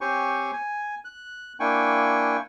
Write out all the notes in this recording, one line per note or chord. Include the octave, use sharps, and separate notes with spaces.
C4 G4 C5 C#5 G#5 C#6
G#5
F#6
A#3 D4 E4 G5 G#5 C#6